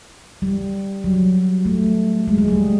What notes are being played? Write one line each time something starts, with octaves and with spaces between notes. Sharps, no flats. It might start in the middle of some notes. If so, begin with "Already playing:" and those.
G3
F#3
A3
G#3
G#3
G3